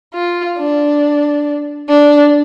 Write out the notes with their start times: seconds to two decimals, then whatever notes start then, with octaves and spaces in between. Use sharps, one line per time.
0.14 F4
0.58 D4
1.89 D4